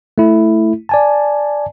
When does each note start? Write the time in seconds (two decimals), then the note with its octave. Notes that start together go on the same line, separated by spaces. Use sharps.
0.18 A3 E4
0.89 D5 G#5 A5